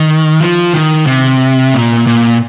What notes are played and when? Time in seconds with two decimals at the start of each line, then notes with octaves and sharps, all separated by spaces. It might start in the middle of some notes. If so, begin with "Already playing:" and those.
Already playing: D#3
0.41 F3
0.73 D#3
1.07 C3
1.74 A#2
2.07 A#2